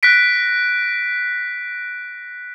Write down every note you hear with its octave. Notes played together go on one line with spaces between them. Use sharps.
F#6 A#6 B6 D7